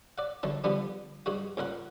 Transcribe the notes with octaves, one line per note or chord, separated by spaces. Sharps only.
D5 F#5
B1 D3 A5
D3 F3 G3 B3 D4
G2 G#3 F#4
C#2 A#2 A#4 F#5